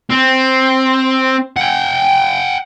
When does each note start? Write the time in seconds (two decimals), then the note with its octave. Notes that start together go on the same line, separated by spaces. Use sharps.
0.10 C4
1.57 F#5 G5